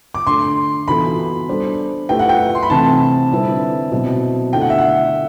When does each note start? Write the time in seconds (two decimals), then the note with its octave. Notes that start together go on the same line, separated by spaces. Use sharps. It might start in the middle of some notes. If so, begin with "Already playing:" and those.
0.15 D6
0.26 D3 A3 D4 C6
0.87 E3 B3 F#4 A4 B5
1.48 G3 D4 A4 C5
2.09 A3 E4 G4 B4 G5
2.19 F#5
2.29 G5
2.55 C6
2.63 B5
2.70 C3 E3 A3 C4 A5
3.30 D3 G3 C4 E4 B4
3.92 B2 F#3 C4 E4
4.53 D3 A3 E4 G5
4.61 F#5
4.70 E5
4.79 F#5